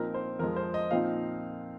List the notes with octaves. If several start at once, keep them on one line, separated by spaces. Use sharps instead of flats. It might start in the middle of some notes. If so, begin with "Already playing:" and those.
Already playing: A#2 F3 C4 D#4 A#4
C5
F2 F3 G#3 A#4
C5
D#5
A#2 F3 C4 D#4 F5